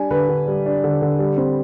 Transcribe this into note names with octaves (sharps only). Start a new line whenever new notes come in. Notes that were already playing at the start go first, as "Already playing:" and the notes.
Already playing: G3 D4 G#5
D3 B4
D3
G3
D4
D3
D3
G3
C4